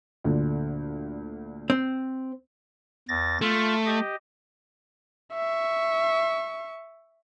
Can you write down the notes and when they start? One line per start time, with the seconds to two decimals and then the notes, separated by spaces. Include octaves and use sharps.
0.24 D2 A#2 D3
1.70 C4
3.08 E2 A6 A#6
3.41 A3 F4
3.86 G4 D#5
5.34 E5 C#6